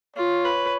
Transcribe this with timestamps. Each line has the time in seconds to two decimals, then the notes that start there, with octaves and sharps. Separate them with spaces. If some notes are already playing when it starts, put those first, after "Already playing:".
0.16 F4 C#5
0.45 B4